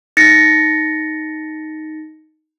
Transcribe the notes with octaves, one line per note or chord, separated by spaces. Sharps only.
D#4 A6 A#6 C#7